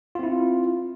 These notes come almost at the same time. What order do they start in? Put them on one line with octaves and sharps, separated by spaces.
F4 C4 E4